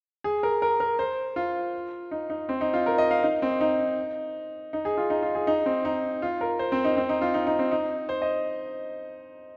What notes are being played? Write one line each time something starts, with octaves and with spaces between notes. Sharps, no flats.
G#4
A#4
A#4
A#4
C5
F4
D#4
D#4
C4
D#4
F4
A#4
D#5
F5
D#4
C4
D#4
D#4
G#4
F4
D#4
F4
G#4
D#4
C4
D#4
F4
A#4
C5
C4
D#4
C4
D#4
F4
D#4
D#4
C4
D#4
C5
D#5